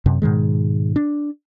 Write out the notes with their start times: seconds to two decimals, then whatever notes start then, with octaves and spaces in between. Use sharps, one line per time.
0.06 F#2 C3
0.22 G#2 B2 D#3 G#3
0.96 D4